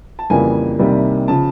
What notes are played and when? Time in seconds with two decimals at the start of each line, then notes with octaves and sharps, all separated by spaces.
0.19 A5
0.30 F2 C#3 E3 G3 A#3 G#5
0.79 C2 C3 D#3 G3 A#3
1.28 C#3 F3 A5